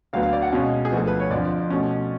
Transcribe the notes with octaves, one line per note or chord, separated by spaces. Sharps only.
D2 D3 F#3 B3 F5
F5
D5
F#5
B2 G#3 C#4 F5
G#4
D2 D3 F3 B3 A4
B4
C#5
F2 D3 F3 D5
B2 A3 C#4